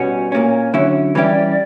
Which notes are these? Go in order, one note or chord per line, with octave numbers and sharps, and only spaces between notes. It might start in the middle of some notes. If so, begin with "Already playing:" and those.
Already playing: B2 G3 C#4 F#4
A#2 A#3 C#4 C#5
D3 F#3 C#4 E4
E3 G3 C#4 E4 G4 D5